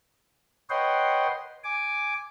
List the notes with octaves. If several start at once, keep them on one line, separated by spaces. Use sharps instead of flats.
B4 C#5 D#5 F#5 G5 C6
G#5 D6